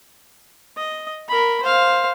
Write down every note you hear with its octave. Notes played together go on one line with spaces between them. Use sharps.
D#5
A#4 B5
C5 F5